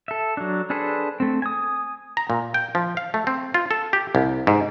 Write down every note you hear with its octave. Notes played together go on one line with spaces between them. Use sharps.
A4 E5
F#3 D4
D4 G#4 A4 B4 C5
A3 C4
G#5 D#6
A#5
A#2
G5
F3
F5
A3
C4
F4
A4
G4
C2
G#2